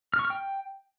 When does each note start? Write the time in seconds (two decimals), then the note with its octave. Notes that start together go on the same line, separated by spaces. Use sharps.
0.14 F6
0.19 C#6
0.25 F6
0.30 G5